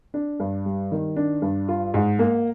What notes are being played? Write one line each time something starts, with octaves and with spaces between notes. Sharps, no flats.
D4
G2
G3
D#3
D4
G2
F4
G#2
A#3